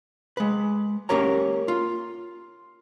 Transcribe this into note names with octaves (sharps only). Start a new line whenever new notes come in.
G#3 B4
A#3 C#4 G4 A#4 C#5 A#5
F4